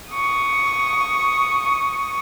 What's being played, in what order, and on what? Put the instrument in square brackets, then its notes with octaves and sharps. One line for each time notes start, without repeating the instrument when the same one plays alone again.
[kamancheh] C#6 D#6